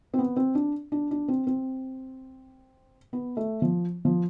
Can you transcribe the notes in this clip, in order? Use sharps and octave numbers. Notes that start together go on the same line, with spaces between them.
C4
B3
C4
D4
D4
D4
C4
C4
B3
A3
F3
F3